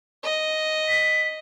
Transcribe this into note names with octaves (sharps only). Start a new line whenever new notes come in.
D#5
B6